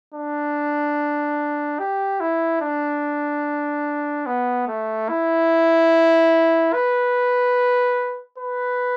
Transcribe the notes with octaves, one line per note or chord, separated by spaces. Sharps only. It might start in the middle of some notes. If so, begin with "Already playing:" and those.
D4
G4
E4
D4
B3
A3
E4
B4
B4